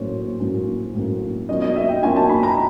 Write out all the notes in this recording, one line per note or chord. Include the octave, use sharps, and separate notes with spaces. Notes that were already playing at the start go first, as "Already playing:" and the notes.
Already playing: A2 F#3 A#3 C#4 C5 C#5
A2 F#3 A#3 C#4
A2 F#3 A#3 C#4
B2 F#3 A#3 C#4 F4 D#5
D#5
E5
G5
B2 F#3 A#3 C#4 F4 G#5
A5
B5
A#5